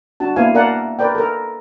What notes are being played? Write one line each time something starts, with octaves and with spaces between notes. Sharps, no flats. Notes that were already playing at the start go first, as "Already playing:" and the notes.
D4 F#4 A5
A#3 B3 E4 F5 G#5
A#4 D5 F5 F#5 G#5 A5
E5
A#4 B4 D5 G5
A4 A#4